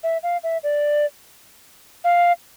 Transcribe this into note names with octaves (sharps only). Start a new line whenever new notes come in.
E5
F5
E5
D5
F5